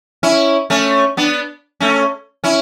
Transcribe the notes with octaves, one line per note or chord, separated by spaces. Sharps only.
C#4 E4
A3 C#4
B3 D4
A3 C#4
C#4 E4